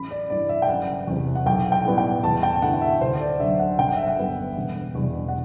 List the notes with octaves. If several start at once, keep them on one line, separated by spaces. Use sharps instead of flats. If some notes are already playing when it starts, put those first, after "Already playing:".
Already playing: A1 B5
D5
G2 E3 D5
E5
G5
F#1 F#5
E2 C3
F#5
B1 G5
G5
A2 G3 B3 E4
G5
E2 A5
G5
D3 A3 E4 F#5
F#5
E5
D2 C5
D5
D3 F#3 E5
F#5
G1 G5
F#5
E5
F#5
G2 D3 G3 B3
E1
E2 B2 G3
F#5